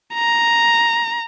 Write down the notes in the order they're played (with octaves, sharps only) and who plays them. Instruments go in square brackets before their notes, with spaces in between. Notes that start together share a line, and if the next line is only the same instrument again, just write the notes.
[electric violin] A#5